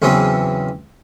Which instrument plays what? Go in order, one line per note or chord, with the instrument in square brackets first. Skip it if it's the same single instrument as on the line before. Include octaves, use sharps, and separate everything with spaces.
[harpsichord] E2 C#3 E3 F#3 C4 C#4